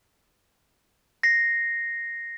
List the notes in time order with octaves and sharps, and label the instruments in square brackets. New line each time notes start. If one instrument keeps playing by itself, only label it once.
[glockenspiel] A#6 C7